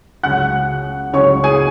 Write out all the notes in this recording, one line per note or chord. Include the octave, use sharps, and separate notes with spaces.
C#2 C#3 F#3 F#5 F#6
C#2 C#3 F#3 C#5 C#6
G#4 G#5